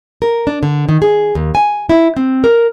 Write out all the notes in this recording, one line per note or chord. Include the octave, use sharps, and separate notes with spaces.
A#4
D4
D3
D#3
G#4
D#2
G#5
E4
C4
A#4